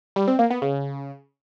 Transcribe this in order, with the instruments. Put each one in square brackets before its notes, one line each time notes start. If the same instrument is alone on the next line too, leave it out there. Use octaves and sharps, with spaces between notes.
[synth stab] G3
C4
A#3
B3
C#3